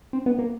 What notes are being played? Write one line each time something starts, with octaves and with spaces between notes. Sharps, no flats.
C4
B3
A#3